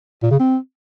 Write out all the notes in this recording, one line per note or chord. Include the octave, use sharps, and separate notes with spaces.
A#2
C#3
C4